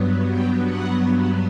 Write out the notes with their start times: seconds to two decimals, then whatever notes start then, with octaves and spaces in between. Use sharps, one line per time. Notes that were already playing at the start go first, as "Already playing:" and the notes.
Already playing: G2 F#3 B3
0.30 G5
0.65 F#5